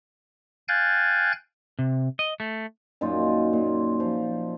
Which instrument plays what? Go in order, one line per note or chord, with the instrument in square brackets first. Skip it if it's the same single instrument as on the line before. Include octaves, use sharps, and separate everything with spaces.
[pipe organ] F5 G5 G#5 F#6 G6 A6
[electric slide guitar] C3
D#5
A3
[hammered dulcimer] F#2 A#2 D#4 F4
A#2
F3